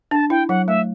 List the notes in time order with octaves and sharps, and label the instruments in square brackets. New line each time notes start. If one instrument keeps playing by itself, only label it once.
[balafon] D4 [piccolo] A5
[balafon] E4 [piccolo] G5
[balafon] F#3 [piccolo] F#5
[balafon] A3 [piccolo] E5